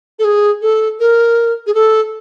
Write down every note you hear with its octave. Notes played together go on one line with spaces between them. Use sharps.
A4
G#4
A4
A#4
G#4
A4